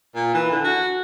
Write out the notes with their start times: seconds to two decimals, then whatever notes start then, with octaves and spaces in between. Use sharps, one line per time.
0.15 A#2
0.34 E3
0.51 D3
0.64 F#4